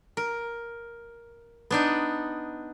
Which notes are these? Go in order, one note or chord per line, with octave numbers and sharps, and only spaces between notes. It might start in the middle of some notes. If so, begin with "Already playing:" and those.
A#4
B3 D4 D#4